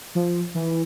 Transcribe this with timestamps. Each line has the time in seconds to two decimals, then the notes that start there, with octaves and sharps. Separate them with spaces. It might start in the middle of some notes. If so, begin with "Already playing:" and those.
0.15 F3
0.55 E3